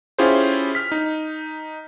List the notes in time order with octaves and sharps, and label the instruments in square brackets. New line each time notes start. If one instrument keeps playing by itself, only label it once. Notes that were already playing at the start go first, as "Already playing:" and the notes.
[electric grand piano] C#4 E4 F4 G4 G#4 C5
F6 B6
D#4